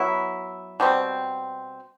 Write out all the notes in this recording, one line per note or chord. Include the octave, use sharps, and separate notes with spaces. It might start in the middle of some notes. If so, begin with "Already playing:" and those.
Already playing: F#3 B3 E4
B2 G3 C4